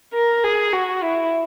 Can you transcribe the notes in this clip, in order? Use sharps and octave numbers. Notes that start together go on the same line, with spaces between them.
A#4
G#4
F#4
E4